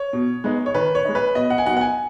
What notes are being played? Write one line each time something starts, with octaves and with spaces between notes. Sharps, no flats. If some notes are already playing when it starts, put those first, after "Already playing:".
Already playing: C#5
B2
G#3 B3 D#4
C#5
D#3 B4
C#5
G#3 D#4
B4
B2 D#5
F#5
G#5
F#3 B3 D#4 F#5
F#5
G#5